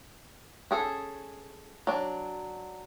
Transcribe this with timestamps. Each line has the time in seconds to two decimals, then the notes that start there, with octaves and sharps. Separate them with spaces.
0.71 C#4 G#4 A4
1.87 F#3 D4